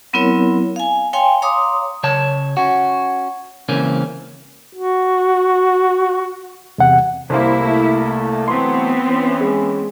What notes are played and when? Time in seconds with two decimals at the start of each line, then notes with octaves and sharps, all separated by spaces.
0.13 F#3 B3 C4 E4 A#4 C#5
0.76 F5 G#5
1.13 C#5 F5 G5 G#5 C6
1.42 C#5 F5 A#5 C6 D6 D#6
2.03 C#3 C#5 A5
2.57 C#4 F#4
3.69 C#2 C#3 E3 A#3 C4 C#4
4.75 F#4
6.78 E2 C3 F#5
7.30 C2 A#3 E4 C5
7.62 A3
8.48 E3 F#3 A3 B3 C4 C6
9.08 E3 C#4
9.41 G#3